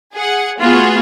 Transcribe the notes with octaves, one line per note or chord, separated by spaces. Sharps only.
G#4 F#5
A3 B3 F4 F#4 G#4